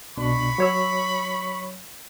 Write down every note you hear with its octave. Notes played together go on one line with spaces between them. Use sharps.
C2 B2 D4 B5 C#6
F#3 C#5 E6